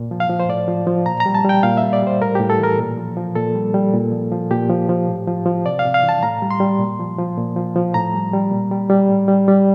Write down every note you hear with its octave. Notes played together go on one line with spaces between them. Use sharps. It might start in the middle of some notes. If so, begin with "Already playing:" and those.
Already playing: A#2
F3
F5
F3
C5
A2 D5
F3
F3
A#2 A#5
A#5
G3
A5
G3 G5
A#2 F5
E5
G3
D5
G3 C5
A2 A#4
A2 G4
A4
E3 A#4
A#2
F3
F3
A#2 A4
G3
G3
A#2
F3
F3
A#2 G4
F3
F3
A2
F3
F3
C3 D5
F5
C3
F5
E3
A5
A2 A#5
G3
C6
G3
A#2
F3
F3
A#2
F3
F3
A2 A#5
G3
G3
A#2
G3
G3
A2
G3
G3